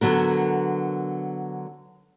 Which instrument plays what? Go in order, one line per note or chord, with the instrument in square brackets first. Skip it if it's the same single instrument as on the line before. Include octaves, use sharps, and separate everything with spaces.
[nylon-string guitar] D3 F#3 B3 A#4